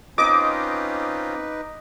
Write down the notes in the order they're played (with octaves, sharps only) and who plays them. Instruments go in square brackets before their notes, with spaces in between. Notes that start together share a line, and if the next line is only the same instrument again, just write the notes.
[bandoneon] C4 C#4 F4 [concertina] D#4 B4 [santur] D#5 [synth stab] D6